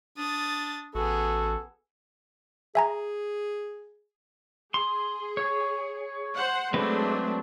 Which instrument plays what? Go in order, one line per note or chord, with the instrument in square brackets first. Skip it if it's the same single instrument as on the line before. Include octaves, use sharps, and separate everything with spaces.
[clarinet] D4 [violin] D#6 A6
[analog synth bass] A1 [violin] B3 G#4 [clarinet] F#4 [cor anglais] A4
[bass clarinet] G#4 [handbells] E5 G#5 A#5
[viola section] G#4 [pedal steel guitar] C6
[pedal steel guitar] C#5
[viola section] C5 F#5
[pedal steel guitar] F#3 C4 B4 [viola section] G#3 A3 D4